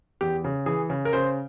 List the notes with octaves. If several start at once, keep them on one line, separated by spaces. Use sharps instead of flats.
E2 G4
C#3
E3 G#4
C#3
A#4
C#3 C5